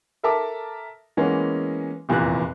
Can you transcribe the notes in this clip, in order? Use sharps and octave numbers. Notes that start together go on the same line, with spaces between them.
A4 A#4 E5 A5 A#5 D6
E3 G#3 A#3 B3 C#4
F1 E2 A#2 E3 F#6